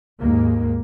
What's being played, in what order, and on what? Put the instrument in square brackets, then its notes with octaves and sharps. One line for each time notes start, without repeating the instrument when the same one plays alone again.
[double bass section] D#2 G#2 A#3